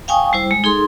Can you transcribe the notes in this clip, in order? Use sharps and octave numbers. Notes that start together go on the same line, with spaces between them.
F5 G5 G#5 C#6 D#6
G3 E4 C5
G#3
D#4 G#4 A4 C6